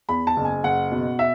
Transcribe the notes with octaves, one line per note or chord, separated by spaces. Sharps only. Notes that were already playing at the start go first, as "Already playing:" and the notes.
E2 B5
A5
F#1
G#5
F#1 F#5
B2
E5